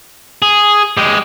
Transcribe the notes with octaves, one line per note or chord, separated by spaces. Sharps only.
G#4
G#3 G4